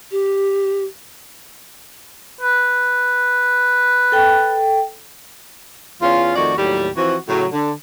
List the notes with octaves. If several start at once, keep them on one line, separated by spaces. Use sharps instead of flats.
G4
B4
A4 G5
E2 C#4 F4
F2 D#3 A3 F#4 D5
D#2 A2 F#3 G3
E3 F3 C4 F#4
A2 C#3 F#3
D3